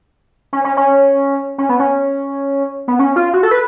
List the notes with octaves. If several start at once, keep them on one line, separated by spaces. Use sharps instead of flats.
C#4
C#4
C#4
C#4
B3
C#4
B3
C#4
F4
F#4
A4
B4